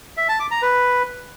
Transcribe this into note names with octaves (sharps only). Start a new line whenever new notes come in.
E5
A5
D6
A#5
B4